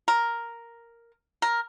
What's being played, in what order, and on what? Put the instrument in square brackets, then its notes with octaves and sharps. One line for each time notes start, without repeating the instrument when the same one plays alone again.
[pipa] A#4
A#4